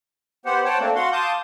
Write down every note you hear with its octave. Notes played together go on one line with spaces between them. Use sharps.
B3 G4 C5 F#5
C5 C#5 F#5 G5 A5
A3 A#3 C4 D4
F#4 F5 F#5 C6
F5 A5 C6 D6 D#6 G6